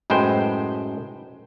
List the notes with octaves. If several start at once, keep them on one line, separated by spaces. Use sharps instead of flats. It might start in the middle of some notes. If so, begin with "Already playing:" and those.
F#2 A2 G#3 B4 C5 G5